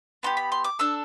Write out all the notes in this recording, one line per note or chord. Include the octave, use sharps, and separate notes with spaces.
B3 D4 G4 C6
B5
C6
D6
D4 A4 E6